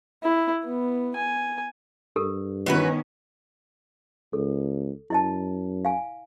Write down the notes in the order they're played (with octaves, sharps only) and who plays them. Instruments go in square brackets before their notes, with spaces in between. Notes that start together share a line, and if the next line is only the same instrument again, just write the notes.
[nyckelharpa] E4
B3
G#5
[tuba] G2 [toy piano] G4 A4 A#4
[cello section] D#3 B3 C#4 [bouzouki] E3 F#4 B4
[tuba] C#2 [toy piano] A4
[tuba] F#2 [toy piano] E4 D#5 A5
[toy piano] F5 G#5